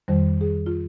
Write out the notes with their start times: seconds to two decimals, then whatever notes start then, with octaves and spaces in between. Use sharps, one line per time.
0.08 F2 D#3 G3 C5
0.41 G#4
0.66 F4